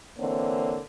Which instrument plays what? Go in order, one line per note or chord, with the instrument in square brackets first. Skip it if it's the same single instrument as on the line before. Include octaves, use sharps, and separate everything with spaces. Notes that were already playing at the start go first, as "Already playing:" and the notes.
[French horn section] D3 E3 A#3 C4 C#5